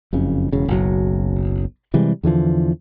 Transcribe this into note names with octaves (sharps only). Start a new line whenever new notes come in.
F#1 F2 C#3
E1 C#3
F#1 B1 F#3
C3 E3 G3 G#3
E2 D3 E3 F3